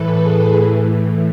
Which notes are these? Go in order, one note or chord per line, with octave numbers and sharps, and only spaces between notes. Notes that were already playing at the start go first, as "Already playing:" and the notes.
Already playing: A2 E3 A4 B4
G#4
A2 E3